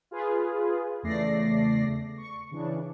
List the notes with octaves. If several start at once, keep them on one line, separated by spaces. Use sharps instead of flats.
F4 G#4 B4
E2 C#3 A3 D5 A#6 C7
C#6
C#3 E3 D4